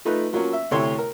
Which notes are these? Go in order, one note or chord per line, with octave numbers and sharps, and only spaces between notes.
F3 A3 D#4 B4
F3 F#3 A#3 C#4
E5
D2 C3 A3 E4 C#5 C6
A#4